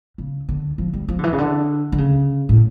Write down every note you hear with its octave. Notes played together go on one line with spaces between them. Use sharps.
C#3
D3
F3
G3
F3
D3
E3
C#3
D3
D3
C#3
A2